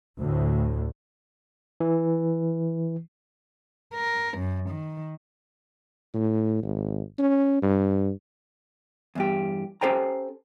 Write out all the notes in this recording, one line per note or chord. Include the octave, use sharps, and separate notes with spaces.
D2 A2
E3
A#4
F#2
D#3
A2
G#1
C#4
G2
E2 G2 G4
C#4 G4 A4 C5 G5 A#5